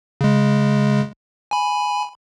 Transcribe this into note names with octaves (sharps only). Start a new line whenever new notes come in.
C#3 G#3
G#5 B5